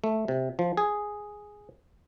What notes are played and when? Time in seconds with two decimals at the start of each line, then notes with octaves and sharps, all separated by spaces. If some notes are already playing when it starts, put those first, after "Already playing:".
0.04 A3
0.28 C3
0.59 F3
0.77 G#4